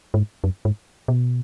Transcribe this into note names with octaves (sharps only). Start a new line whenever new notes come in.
G#2
F#2
G#2
B2